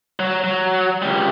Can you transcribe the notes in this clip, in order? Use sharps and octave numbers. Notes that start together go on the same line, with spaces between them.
F#3
F#3
C#2 G3